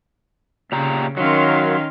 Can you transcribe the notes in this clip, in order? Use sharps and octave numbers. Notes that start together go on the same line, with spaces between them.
A#2 C#3 G4 A#5
D#3 F#3 C#4 A#4 F5 C6